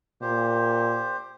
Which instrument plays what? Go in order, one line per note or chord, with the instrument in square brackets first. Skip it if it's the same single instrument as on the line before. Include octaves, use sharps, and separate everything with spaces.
[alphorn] A#2 [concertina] G4 C5